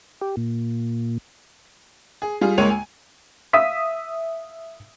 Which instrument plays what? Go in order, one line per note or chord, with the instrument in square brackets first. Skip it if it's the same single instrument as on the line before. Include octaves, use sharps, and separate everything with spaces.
[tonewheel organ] G4
A#2
[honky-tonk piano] G#4
G3 F4 G#4
C#2 G#3 A#3 C#5 D#7
G#5
[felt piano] E5 F5 D#6 E6 B6